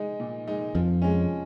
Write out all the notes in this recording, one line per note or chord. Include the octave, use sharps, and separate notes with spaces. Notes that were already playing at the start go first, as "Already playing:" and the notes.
Already playing: G#3 D#4
A#2
G#3 D#4
F2 F3
G#3 C#4